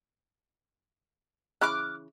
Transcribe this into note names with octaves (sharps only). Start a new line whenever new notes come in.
C#3 E3 B5 D6 F6 F#6